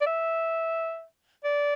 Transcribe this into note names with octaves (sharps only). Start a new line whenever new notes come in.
D5
E5
D5